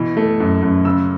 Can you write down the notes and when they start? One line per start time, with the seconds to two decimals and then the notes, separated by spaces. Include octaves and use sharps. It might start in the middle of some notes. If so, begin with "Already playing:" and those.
Already playing: B2 E3
0.17 A3
0.40 F#2
0.62 F#2
0.85 C#3 E6